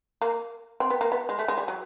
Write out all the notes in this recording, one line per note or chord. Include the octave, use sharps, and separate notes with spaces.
A#3
C4
B3
A#3
B3
G#3
A3
G#3
G3
F#3